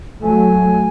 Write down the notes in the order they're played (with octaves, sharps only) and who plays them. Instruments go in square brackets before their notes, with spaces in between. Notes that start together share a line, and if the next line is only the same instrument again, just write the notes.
[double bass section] F#3 A3 [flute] G#5